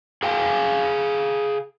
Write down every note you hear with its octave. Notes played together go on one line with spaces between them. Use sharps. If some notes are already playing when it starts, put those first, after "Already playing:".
G#4 F5 G5 G#5